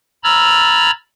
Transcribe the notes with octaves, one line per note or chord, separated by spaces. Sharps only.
A#5 B5 E6 F6 G#6 A6